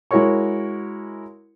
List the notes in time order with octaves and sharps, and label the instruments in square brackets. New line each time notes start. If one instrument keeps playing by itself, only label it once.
[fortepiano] G#3 E4 F#4 A#4 C#5 C#6